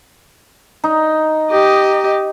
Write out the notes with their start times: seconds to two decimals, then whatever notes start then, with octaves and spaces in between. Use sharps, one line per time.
0.84 D#4
1.51 G4 D#5